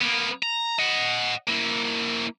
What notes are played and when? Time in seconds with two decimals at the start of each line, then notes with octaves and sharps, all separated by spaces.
0.02 A#3 B3
0.43 A#5
0.79 D#5 F#5
1.48 A#3 E4